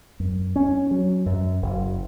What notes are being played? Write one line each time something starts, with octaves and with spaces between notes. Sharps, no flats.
F#2
C#4
F#3
F#2
F#1